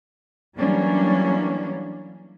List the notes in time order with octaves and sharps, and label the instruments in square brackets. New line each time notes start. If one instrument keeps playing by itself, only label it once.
[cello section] E3 F#3 G3 A#3 C#4 D4